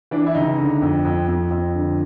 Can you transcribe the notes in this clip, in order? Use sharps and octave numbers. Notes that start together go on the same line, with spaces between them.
E3 D4
E4
C#2 D#4
D3
F2
F2
F2
F2
D3